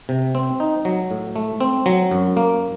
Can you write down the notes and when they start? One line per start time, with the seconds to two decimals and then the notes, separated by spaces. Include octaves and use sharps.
0.09 C3
0.35 C4
0.60 D#4
0.85 F#3
1.11 A2
1.36 A3
1.61 C4
1.86 F#3
2.11 F#2
2.37 A#3